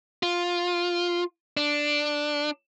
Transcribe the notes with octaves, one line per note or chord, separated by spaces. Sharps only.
F4
D4